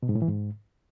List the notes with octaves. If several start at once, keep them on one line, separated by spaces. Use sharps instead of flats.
B2
G#2
A2
E3
G#2